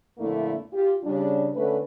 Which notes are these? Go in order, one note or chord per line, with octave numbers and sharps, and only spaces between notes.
F2 A#2 D3 A3 A#3 E4
F4 G4
C#3 G3 D4
D3 A3 A#3 C#4 B4